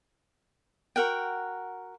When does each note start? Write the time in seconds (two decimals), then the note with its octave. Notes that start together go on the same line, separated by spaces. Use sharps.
0.96 F#4 A#4 F#5 G5